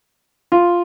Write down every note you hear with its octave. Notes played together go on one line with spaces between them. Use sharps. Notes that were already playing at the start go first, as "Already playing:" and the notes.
F4